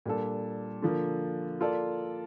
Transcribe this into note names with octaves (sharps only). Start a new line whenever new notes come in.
A#2 G3 D4 A4
D3 F3 A#3
A#3 F4 A4 D5